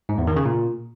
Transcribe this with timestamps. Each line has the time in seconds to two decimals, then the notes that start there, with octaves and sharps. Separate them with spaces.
0.09 G#2
0.18 E2
0.27 D#3
0.36 C#3
0.46 A#2